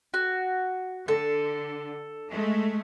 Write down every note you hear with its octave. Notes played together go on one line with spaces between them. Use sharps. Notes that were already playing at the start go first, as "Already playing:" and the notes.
F#4
D3 A4
G#3 A3